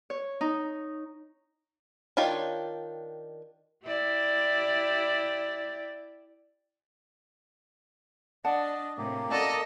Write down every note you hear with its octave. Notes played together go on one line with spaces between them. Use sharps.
C#5
D#4
D#3 D4 F4 G4 C#5
E4 G4 D5
D4 D5 D#5 F#5 A5
A2 C3 A#3 G4
C#4 F#4 A4 A#4 D5 D#5